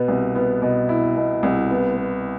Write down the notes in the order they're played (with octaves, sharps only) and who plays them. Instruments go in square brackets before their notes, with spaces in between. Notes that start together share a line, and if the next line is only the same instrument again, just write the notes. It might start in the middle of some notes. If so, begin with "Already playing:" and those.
Already playing: [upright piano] B2 B3
C2
B3
B2
E4
B2
C2
B3
B3